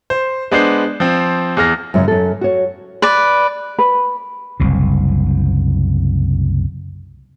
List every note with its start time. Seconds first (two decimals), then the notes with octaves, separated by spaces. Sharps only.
0.10 C5
0.51 G#3 B3 D4 C5 G6 C7
1.00 F3 C4
1.57 E2 G#4 F6 A#6
1.94 F#2 A2 C#3
2.08 F#2 A4
2.41 F#4 C#5
3.02 B4 D5
3.79 B4
4.60 F#1 C2 C3